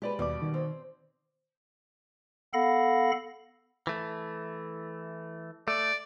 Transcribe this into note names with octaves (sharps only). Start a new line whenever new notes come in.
G#3 G4 G#4 B4 D5
D#2 B2 G3 D5 D6
D#3
C4
B3 A4 F5 F#5 B5 A#6
E3 A3
A3 D5